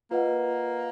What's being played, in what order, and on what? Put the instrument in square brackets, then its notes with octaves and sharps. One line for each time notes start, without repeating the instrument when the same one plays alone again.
[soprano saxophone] A#3 [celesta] F4 B4 D#5 F#5